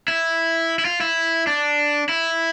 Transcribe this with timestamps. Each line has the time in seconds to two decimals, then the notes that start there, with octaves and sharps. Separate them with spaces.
0.08 E4
0.79 E4
0.85 F4
1.01 E4
1.47 D4
2.09 E4